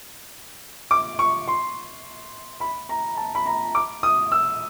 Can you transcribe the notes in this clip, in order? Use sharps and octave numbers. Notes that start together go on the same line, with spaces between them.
D6
C#6
C6
B5
A#5
A5
B5
A#5
D6
D#6
E6